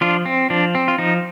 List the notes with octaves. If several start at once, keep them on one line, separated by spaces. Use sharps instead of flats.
F3 D4 F4
C4
F3 D4
C4
F4
F3 D#4